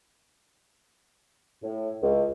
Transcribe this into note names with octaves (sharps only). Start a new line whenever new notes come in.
A2
C#2